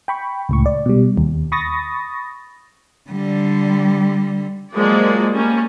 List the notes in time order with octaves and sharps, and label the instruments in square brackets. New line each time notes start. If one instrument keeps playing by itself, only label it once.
[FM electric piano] G5 B5 C#6
C#2 A2 C#6
D5
B2 G3
D#2
B5 C#6 D#6 A6 A#6
[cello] D3 G3
[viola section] F3 F#3 G#3 A#3 D5
G3 A#3 C#4